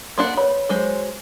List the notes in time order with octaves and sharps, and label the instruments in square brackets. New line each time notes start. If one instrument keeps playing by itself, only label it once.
[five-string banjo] A#3 D4 F#5 [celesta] C6
[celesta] B4 C#5 [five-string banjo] B5
[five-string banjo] F#3 G#3 C5